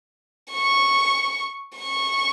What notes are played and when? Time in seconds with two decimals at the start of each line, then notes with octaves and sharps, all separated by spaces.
0.52 C#6
1.77 C#6